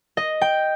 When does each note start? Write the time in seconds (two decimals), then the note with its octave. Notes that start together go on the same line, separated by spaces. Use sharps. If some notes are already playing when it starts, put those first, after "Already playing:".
0.17 D#5
0.41 G5